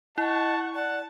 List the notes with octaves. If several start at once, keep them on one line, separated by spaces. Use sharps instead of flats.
E4 D#5 F#5 A5 C#6
D5 F#5 A5